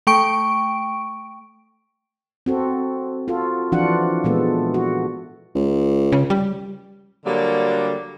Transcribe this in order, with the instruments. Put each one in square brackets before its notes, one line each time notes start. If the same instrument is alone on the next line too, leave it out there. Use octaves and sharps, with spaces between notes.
[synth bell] A3 G5 C#6 D7
[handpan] C4 F#4 A4
F4 F#4 A4
E3 F3 D4 F4 F#4 F#5
A#2 E3 G#3 B3 A4
F#4
[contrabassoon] C#2
[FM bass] C#3
G3
[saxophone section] D3 F#3 G3 A#3